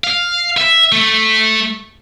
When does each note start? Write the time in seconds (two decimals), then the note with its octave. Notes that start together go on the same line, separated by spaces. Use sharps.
0.04 F5
0.57 E5
0.92 A3